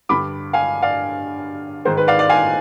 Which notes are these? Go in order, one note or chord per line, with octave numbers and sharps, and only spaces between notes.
G2 D3 B5 D6
F5 G#5
D5 F5
G#2 D#3 C5
B4
D5 F5
D5 F5
F5 G#5